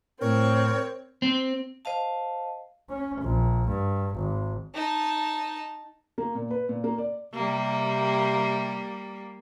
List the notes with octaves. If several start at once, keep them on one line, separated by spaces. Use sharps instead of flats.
A2 C4 A#4 C#5
C4
C5 D#5 F5 A5
C#4
A#1
G2
G#1
D#4 A5
A#3
A#2
B4
A#2
A#3
D5
C3 G3 A#3